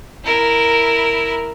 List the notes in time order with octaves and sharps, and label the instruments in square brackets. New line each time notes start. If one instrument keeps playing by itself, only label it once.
[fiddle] E4 A#4